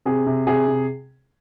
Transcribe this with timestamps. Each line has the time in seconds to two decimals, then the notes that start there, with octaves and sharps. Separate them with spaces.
0.06 C3 G#4
0.26 C3
0.47 C3 G#4
0.68 C3